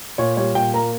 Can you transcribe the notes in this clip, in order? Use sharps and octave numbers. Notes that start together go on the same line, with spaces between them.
A#2 C#5
G3 C#5
A#2 G5
A#3 A#5